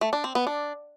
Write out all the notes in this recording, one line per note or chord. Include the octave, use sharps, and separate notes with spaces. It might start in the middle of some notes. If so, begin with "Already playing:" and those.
A3
D4
C4
B3
D4